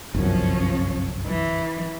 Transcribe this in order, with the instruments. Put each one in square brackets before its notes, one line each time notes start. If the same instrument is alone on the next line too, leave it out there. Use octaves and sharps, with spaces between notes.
[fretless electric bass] G1 C2 F#2 [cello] F3 C#4
[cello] E3